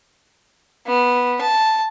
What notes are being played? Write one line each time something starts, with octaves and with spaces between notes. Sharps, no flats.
B3
A5